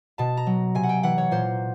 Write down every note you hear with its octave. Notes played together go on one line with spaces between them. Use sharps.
B2 A5
A#5
F#3
C3 G#5
F#5
G5
E3 F#5
C#5
A#2 C5